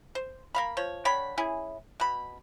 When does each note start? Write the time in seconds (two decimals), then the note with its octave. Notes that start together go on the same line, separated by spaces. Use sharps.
0.15 C5
0.55 A#3 F5 B5
0.77 F3 C#5
1.05 D3 C#5 G5 B5
1.38 C#4 E4 G#4
2.00 B2 B5